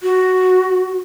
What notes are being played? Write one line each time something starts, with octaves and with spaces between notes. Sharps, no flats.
F#4